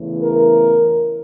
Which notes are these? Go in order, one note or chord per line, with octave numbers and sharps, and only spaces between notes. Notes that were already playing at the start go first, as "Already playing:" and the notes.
Already playing: E2 C#3 E3 A3
A#4